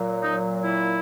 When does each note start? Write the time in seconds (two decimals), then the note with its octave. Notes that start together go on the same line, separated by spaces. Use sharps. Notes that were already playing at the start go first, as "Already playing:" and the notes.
Already playing: A#2 F#3
0.23 D#4
0.64 E4